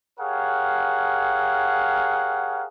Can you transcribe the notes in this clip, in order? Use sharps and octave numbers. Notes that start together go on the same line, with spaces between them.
G4 G#4 A#4 C#5 F5 F#5